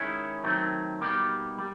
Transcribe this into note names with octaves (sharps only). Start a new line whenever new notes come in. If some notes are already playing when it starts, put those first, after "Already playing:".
Already playing: D#3 G#3 C#4 E4
D#3 F#3 A3 C4
B2 G3 A#3 D#4 G4
G3